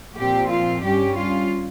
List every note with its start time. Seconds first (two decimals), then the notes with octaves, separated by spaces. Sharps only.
0.17 A#2 F3 C4 G4
0.51 F4
0.84 G2 G3 C#4 G4
1.17 F4